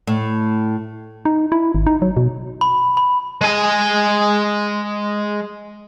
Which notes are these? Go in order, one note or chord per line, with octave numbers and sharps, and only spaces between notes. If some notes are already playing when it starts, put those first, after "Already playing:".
A2
D#4
E4
G#1
D#4
F#3
B2
B5
B5
G#3 G#5